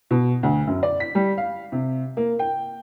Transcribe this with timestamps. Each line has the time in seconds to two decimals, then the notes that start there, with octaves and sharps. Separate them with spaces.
0.11 B2
0.43 D2
0.67 F#2
0.83 D5
1.00 B6
1.15 G3
1.38 F5
1.72 C3
2.17 A#3
2.39 G5